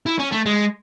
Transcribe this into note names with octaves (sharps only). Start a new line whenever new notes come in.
E4
C#4
A3
G#3